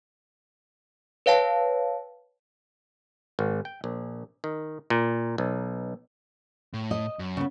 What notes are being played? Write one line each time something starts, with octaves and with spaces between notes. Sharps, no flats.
B4 C#5 F5 G5 A5
G#1
G5
A#1
D#3
A#2
B1
A2
D#5
F#2
C#3 B3